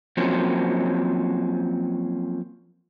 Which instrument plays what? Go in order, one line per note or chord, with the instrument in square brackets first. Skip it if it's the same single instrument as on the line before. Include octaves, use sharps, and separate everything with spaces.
[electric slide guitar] F3 F#3 A#3 C4 C#4